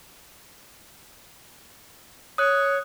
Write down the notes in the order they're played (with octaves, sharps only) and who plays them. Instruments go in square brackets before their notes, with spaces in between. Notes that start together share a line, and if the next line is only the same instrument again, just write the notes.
[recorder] C#5 [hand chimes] D#6 F#6